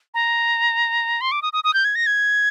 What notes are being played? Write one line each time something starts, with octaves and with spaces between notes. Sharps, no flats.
A#5
C6
D6
D#6
D#6
D#6
G6
G#6
A#6
G#6